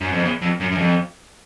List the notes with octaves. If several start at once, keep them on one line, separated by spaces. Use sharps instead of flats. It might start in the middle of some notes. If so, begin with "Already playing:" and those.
F#2
F2
E2
F2
F#2
F#2
F2